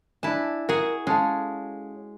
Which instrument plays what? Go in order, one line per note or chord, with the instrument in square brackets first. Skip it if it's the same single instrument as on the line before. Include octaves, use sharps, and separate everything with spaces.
[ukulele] D4 G#5 [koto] E4 A5
[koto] F#4 G#4 [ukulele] A#4
[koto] G#3 [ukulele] C#4 A4 F5